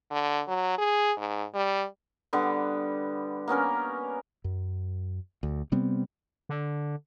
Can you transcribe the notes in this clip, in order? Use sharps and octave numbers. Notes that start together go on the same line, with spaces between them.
D3
F#3
G#4
G#2
G3
D3 G3 B3
A#3 B3 C#4 A#4
F#2
D2
C3 G3 B3 C4
D3